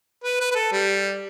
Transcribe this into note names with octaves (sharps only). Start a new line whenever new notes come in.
B4
B4
B4
A4
G3